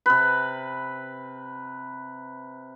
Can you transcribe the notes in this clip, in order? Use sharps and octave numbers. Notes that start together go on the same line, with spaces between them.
C3 B4